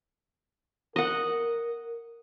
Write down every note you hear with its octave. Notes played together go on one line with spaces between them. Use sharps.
A#4 D#5 F#5